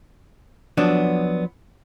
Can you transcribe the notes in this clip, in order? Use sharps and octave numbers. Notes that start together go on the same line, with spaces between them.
F3 F#3 B3 D4